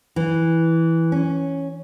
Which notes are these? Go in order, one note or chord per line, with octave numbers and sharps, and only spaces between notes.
E3
C#4